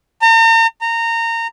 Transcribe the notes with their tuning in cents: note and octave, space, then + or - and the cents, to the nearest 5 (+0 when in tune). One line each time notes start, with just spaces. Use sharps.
A#5 -45
A#5 -25